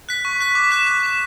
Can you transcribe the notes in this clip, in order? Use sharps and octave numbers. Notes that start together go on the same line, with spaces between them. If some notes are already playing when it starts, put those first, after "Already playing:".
F#6 B6
C#6
F#6 B6
D6
F#6 B6 E7
D6
F#6 B6 E7